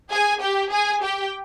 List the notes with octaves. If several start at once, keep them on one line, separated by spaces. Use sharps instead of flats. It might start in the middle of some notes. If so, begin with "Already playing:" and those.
G#4 G#5
G4 G5
G#4 G#5
G4 G5